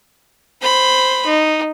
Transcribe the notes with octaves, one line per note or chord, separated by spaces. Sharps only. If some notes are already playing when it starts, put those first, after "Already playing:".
C5 B5
D#4